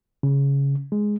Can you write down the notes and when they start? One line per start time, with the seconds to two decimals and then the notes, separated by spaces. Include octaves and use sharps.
0.23 C#3
0.92 G#3